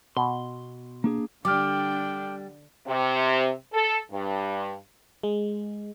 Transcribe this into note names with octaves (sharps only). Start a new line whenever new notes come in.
B2 C6
A#3 D4 G#4
D3 G3 D4 G5 D6 F6
C3
A4
G2
G#3